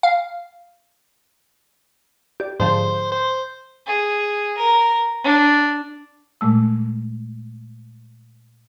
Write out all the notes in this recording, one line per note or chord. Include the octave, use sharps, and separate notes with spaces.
F5
G4 D5
G#2 D3 F3 C5
C5
G#4
A#4
D4
A#2 G#3 A3 E6